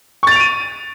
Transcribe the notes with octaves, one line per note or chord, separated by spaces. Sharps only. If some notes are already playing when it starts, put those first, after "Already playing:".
C#6 A6 D7 D#7 F7